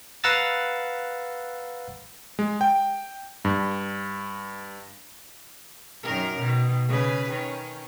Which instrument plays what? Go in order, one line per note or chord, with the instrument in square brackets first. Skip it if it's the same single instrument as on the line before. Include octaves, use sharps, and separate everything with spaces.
[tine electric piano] B4 F5 F#5 A#5 E6 A6
[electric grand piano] G#3
G5
G2
[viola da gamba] F#2 D#3 A#4
B2 D#3
C#3 G#4 B4
D#3 C#4